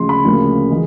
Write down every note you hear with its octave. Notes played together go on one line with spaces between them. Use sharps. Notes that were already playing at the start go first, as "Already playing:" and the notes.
Already playing: D2 C#3 F3 G#3 C6
B5
D2 C#3 F3 A#3
E3 G#3